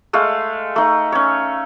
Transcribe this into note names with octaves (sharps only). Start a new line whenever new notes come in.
G#3 A3 F5
A3 D#4
C#4 C#5